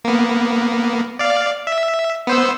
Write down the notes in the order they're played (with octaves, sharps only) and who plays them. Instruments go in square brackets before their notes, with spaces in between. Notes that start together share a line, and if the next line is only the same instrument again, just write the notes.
[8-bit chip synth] A#3 B3
D5 F5
E5
B3 C5 E6